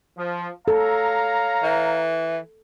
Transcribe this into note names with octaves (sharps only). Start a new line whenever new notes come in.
F3
A4 C#5 F5 A#5
E3